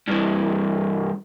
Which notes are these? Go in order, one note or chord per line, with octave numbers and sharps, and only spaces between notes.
G2 E3